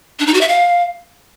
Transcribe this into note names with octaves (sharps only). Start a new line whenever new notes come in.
D4
D#4
F#4
E5
F5